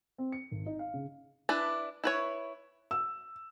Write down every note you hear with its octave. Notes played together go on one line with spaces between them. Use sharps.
C4
C#7
G#1
D#4
F5
C#3
D4 E4 B4
E4 B4 C#5
E6